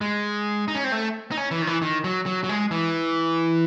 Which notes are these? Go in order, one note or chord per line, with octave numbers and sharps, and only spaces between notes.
G#3
D#4
C#4
C4
A3
D#4
C#4
E3
D#3
E3
D#3
F#3
F#3
F#3
G#3
E3